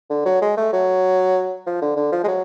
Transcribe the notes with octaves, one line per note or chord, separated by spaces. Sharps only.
D3
F#3
G#3
A3
F#3
F3
D3
D3
F3
G#3
F#3